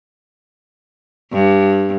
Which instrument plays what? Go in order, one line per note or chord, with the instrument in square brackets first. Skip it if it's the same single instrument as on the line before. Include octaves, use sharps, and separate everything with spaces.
[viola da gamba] G2